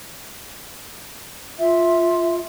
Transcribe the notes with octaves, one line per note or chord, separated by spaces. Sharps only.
F4 E5